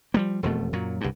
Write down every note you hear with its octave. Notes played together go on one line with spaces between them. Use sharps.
F3 G3 A#3
E1 F2 B2 A3
F#2 A#2 F#3
C2 G2